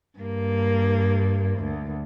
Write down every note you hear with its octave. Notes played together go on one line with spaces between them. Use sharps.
G2 A#3
D2